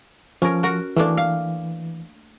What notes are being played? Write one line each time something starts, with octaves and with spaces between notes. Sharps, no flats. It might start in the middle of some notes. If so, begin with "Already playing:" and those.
F3 C#4 A#4
F#4 A#4 F#5
E3 A3 A#3 D4
F5